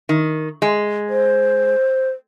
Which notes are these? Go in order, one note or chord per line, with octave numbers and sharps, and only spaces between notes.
D#3
G#3
C5